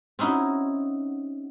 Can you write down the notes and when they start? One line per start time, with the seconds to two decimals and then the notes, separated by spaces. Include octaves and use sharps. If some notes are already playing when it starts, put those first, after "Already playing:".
0.19 C4 C#4 D#4 E4 F#4